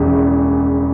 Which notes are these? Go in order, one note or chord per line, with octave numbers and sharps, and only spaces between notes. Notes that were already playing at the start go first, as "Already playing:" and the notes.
Already playing: E1 E2 C#3 E3